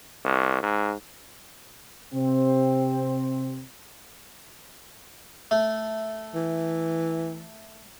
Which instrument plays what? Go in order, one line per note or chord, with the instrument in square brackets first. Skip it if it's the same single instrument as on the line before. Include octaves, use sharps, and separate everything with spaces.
[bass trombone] C2
G#2
[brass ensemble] C3 C4
[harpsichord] A3
[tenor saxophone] E3